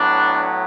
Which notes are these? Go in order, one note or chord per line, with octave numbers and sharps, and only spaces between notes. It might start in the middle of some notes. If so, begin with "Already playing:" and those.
Already playing: A2 F#3 B3 D4